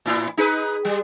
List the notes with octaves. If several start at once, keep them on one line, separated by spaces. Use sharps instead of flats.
A2 E4
D#4 G#4 B4
G3